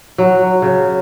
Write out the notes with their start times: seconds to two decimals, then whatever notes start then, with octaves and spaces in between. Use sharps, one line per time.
0.18 F#3
0.62 C#3